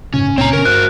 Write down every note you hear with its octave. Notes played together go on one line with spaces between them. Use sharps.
G1 A2 C#3 C#4
C#2 A#2 C4 C#4 C#5 A#5
B2 D3 D#3 A#4
G1 F#4 C5 F#6